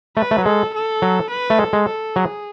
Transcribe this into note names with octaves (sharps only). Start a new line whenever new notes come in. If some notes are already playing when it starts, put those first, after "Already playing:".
A3 B4
A3
F#3
G#3 A4
A4
F#3
B4
A3
G#3 A4
G#3
A4
F#3 G#4